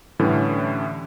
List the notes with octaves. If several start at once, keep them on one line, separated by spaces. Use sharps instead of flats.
A2 D3 E3 G3 C#4